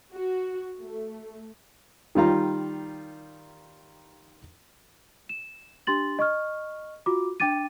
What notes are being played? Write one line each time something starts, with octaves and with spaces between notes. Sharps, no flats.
F#4
A3
D#3 G3 F4 A#5
E7
D4 G4 C6 A6 F#7
D#5 C#6 F6
F4 F#4 D6
D4 G5 D6 A6 D#7